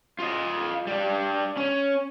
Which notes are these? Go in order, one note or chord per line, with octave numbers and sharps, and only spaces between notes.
F4 D#5
G3 D4
C#4